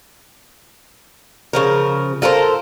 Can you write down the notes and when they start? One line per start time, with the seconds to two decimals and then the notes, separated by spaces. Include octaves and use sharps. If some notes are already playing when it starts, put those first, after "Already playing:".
1.53 C#3 F3 A#4
2.22 F4 A4 A#4 C5